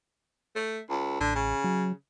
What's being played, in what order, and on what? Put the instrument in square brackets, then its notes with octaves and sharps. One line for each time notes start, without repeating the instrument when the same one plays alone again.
[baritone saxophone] A3
C#2
[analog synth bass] A1 [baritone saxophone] D3
[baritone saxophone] C#3
[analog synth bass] F#3